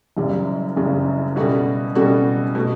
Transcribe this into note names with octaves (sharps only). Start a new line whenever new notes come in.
F#1 F#2 C#3 G3
F#1 F#2 C#3 G3
B2 G3 C#4 F#4 A4
B2 G3 C#4 F#4 A4
B2 A3